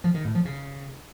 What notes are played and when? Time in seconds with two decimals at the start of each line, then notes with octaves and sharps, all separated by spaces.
0.04 F3
0.14 D#3
0.25 A2
0.35 F3
0.45 C#3